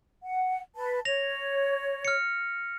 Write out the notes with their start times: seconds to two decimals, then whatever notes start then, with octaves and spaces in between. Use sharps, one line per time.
0.22 F#5
0.75 B4 A5
1.05 C#5 A#6 F7
2.05 F6 C#7